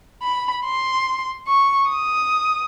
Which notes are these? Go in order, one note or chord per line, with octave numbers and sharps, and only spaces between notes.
B5
C6
C#6
D#6